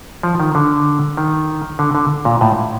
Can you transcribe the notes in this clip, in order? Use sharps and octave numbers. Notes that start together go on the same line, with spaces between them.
F3
D#3
D3
D#3
D3
D3
A#2
A2